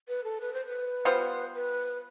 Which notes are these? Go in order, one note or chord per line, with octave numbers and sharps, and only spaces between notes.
B4
A4
B4
C5
B4
G3 B3 F4 C5
B4